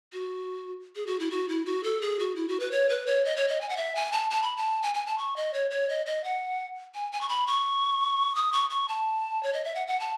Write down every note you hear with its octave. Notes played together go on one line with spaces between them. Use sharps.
F#4
G#4
F#4
E4
F#4
E4
F#4
A4
G#4
F#4
E4
F#4
B4
C#5
B4
C#5
D#5
C#5
D#5
G#5
F#5
E5
G#5
A5
A5
B5
A5
G#5
G#5
A5
C#6
D#5
C#5
C#5
D#5
D#5
F#5
G#5
G#5
C#6
B5
C#6
D#6
C#6
C#6
A5
C#5
D#5
E5
F#5
F#5
A5